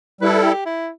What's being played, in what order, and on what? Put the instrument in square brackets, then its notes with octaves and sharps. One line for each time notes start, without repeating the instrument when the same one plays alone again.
[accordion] G3 E4 A4 [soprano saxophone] B4
[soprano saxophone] G4
E4